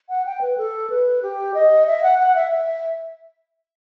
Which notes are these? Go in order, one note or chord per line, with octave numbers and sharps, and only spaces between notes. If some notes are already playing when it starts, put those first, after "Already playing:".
F#5
G5
B4
A4
B4
G4
D#5
E5
F#5
F#5
E5
E5